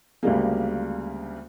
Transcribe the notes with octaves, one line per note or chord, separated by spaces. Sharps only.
D2 C#3 G3 G#3 A#3